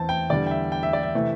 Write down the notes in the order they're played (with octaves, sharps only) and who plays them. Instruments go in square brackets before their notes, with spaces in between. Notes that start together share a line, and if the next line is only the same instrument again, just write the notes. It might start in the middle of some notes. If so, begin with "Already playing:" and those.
Already playing: [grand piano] E2 E3 C4 A5
G5
E2 D3 G3 D5
G5
E5
G5
E5
D5
E5
C3 E3 A3